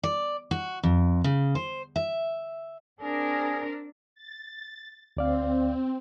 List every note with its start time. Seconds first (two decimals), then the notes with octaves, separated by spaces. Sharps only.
0.03 D5
0.51 F#4
0.83 F2
1.24 C#3
1.55 C5
1.96 E5
3.01 C4 D4 G#4 A#4
4.15 A6
5.17 D2 C4 D5 F5